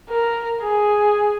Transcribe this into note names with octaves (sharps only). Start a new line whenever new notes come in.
A#4
G#4